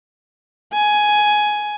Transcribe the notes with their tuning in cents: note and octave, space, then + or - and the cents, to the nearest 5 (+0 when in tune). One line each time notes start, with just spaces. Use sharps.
G#5 +10